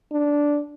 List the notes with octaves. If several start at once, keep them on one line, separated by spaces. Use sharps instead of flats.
D4